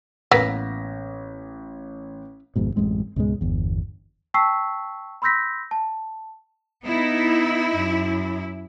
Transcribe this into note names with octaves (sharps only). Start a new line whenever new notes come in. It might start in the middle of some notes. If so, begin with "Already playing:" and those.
A1 A#3 B3 A#6 B6
G#1 F2 G#2 B2
A1 F#2 G#3 C4
C#2 G#2 B2 G#3
G1 E2
G5 A5 C#6 E6 B6 C7
B5 C6 E6 G6 A#6 B6
A5
B3 D#4 E4
F#2